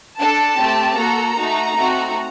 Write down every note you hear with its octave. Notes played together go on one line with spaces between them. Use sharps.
D4 A4 A5
A3 C4 G4
A#3 F#4 A4 A#5
A3 D#4 F#4
A3 C4 D#4 F#4